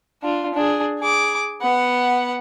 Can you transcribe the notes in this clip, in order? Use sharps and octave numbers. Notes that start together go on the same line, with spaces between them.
D4 F4
D4 G#4
G#4 D6
B3 F#5